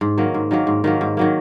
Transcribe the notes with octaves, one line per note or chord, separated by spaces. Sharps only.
G#2
D#3 F#3 A#3
G#2
D#3 F#3 A#3
G#2
D#3 F#3 A#3
G#2
D#3 F#3 A#3